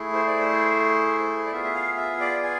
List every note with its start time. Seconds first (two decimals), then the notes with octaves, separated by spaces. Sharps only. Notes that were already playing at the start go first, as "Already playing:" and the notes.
Already playing: A3 E4 G#4
0.14 C5
0.27 D5
0.40 C5
1.47 D5
1.51 B3 F4 G#4 E5
1.64 E5
1.75 F5
1.97 E5
2.20 D5
2.43 G#5